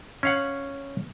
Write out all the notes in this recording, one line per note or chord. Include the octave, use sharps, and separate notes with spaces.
C#4 F5 F#5